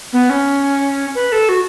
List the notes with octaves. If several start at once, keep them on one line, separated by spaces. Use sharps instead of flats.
B3
C#4
B4
A4
F#4